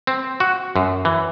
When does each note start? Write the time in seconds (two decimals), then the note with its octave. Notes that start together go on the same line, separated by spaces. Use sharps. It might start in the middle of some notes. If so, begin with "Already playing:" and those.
0.07 C4
0.40 F#4
0.76 F#2
1.05 E3